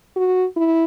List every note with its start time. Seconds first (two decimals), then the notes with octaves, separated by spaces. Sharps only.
0.16 F#4
0.57 E4